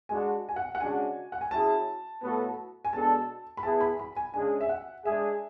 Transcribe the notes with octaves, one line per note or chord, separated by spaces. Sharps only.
G#3 D4 F#4 G#5
G#5
F#5
F#5
C#3 G#3 D4 F#4 G#5
F#5
G#5
F#3 C#4 E4 G#4 A5
A2 F#3 B3 F#4 A4
G#5
B2 G#3 D4 A4 A5
B5
E3 B3 E4 G#4 A5
B5
B5
G#5
C#3 G#3 D4 G#4 G#5
E5
F#5
G#3 D4 G#4 E5